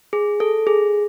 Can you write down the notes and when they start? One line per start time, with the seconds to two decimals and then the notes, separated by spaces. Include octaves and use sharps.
0.13 G#4
0.40 A4
0.67 G#4